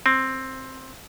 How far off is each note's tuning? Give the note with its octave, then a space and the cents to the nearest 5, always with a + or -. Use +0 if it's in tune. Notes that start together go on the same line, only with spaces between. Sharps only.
C4 +10